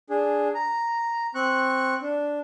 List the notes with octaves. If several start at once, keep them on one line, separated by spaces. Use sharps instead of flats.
D4 G#4
A#5
C4 C#6 F#6
D4